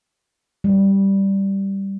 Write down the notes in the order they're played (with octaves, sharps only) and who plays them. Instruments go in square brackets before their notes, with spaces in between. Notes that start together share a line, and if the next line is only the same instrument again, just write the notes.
[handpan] G3